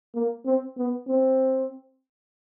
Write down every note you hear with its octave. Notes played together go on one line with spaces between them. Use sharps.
A#3
C4
B3
C4